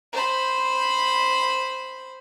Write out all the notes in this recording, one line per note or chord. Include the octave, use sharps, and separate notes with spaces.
C5 B5